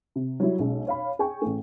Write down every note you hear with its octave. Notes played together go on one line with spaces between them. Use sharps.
C3
F#3 G3 E4
B1 G#3 C#4 D#4
C#5 F5 B5
G#4 G5 G#5 C#6
A1 A3